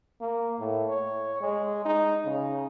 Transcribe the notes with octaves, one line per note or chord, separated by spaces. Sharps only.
A#3
A2
C#5
G#3
D#4
C#3